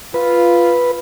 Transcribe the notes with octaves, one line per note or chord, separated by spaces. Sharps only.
F4 B4